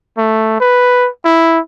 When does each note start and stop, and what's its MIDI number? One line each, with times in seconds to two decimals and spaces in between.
0.18 0.56 57
0.60 1.09 71
1.25 1.59 64